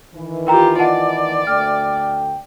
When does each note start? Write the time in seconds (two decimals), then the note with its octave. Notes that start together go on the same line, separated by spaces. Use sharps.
0.15 D#3 E3
0.47 F4 G4 A#4 G5 A#5
0.79 D5 D#5 F#5 A5
1.47 D2 A3 G5 F6